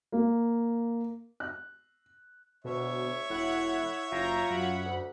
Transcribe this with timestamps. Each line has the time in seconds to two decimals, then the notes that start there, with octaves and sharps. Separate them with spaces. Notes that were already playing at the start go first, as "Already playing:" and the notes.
0.12 A#3
1.40 F#6
2.64 D2 B2 C#5 E5
3.30 E1 A2 E4 F#5
4.12 F#1 F4 G5 A#5
4.50 F#2 F#5 B5
4.85 D2